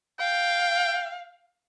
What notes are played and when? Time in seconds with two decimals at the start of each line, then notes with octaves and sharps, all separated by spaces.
0.19 F5 G5